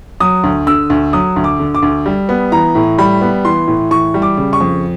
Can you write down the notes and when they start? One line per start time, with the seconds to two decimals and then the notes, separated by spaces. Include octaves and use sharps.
0.20 F#3 D#6
0.44 D2
0.67 D3 E6
0.90 D2
1.13 F#3 D#6
1.36 D2
1.44 D6
1.60 D3
1.75 D6
1.82 D2
2.06 G3
2.29 B3
2.52 E3 A#5
2.75 A2
2.98 G3 B5
3.21 B3
3.45 E3 C6
3.68 A2
3.91 E3 C#6
4.14 G3
4.22 D6
4.37 C#3
4.53 C#6
4.60 F2